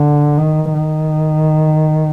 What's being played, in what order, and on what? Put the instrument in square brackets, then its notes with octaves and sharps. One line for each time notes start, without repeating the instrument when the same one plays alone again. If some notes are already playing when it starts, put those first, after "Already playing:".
Already playing: [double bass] D3
D#3
D#3